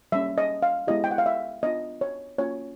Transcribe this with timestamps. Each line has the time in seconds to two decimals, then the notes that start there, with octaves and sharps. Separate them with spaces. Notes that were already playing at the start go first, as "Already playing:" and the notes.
0.12 G3 A#3 C#4 E5
0.38 D#5
0.63 F5
0.87 G#3 B3 E4 G4 D#5
1.04 G5
1.11 F#5
1.18 F5
1.26 E5
1.63 B3 D4 F4 D#5
2.01 C#5
2.38 A#3 C#4 F4 C#5